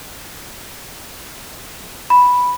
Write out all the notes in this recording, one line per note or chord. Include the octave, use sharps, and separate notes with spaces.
B5